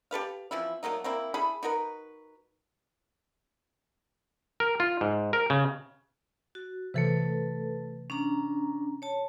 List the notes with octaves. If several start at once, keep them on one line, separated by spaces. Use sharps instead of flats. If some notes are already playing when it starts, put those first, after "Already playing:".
G4 A4 B4 F5
E3 F3 C4 E4
F#3 A3 A#3 D#4
A#3 C4 E4
E4 G#4 A4 B5
D#4 F#4 A#4 B4
A#4
F4
G#2
A#4
C#3
F#4
C3 E3 A3 A4 B4
C#4 D4 A#5
C#5 A5